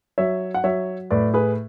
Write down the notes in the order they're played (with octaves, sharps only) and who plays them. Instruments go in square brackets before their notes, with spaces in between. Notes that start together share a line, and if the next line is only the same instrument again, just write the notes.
[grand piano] F#3 C#5 E5
F#5
F#3 C#5 E5
A2 B4 D5
G#4 B4